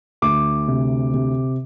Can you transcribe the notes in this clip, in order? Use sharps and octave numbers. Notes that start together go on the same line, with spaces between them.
D2 D6
C3
C3